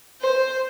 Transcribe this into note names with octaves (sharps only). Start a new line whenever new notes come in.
C5